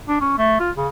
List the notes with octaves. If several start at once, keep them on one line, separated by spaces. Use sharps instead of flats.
D4
C#4
A3
F4
C#3